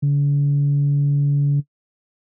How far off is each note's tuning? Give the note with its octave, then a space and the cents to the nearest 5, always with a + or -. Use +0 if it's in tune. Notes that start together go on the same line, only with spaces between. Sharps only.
D3 -45